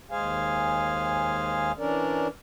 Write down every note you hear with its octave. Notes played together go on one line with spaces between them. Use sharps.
D#2 G#3 G#4 C5 F5 G#5
E3 C#4 D4 A#4 D5